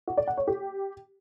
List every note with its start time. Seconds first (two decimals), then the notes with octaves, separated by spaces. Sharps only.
0.08 F#4
0.18 D5
0.27 F#5
0.37 C#5
0.47 G4